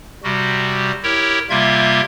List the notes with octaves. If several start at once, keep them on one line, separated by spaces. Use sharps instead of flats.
C3 G3 F#4
E4 G4 A#4 C#5
C3 G3 A#3 F4 E5 G#6